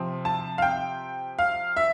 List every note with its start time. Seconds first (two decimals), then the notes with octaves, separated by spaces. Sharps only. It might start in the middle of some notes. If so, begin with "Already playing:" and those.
Already playing: C3 F3 C4
0.25 A5
0.58 F5
0.62 G5
1.39 F5
1.76 E5